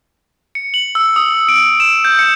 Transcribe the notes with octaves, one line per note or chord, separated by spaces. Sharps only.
C#7
F#7
E6
D#6
D7
E7
G6
C#7